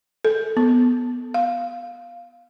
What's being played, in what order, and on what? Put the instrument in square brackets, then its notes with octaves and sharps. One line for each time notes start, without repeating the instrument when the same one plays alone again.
[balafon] A4
B3
F5